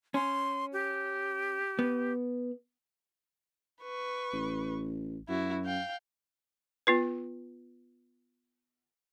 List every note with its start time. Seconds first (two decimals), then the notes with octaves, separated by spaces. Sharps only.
0.14 C#4 C6
0.73 G4
1.79 B3
3.83 B4 C#6
4.33 A1
5.29 F#2 E4 F#4
5.65 F5 G5
6.87 B3 F4 B4